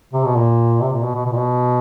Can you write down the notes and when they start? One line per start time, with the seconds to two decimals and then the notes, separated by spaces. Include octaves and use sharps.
0.13 C3
0.25 B2
0.36 A#2
0.81 C3
0.92 A#2
1.03 B2
1.15 B2
1.26 B2
1.32 A#2
1.37 B2